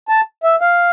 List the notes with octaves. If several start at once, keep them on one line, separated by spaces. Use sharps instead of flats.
A5
E5
F5